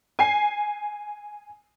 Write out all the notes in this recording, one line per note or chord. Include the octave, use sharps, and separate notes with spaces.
G#5 C7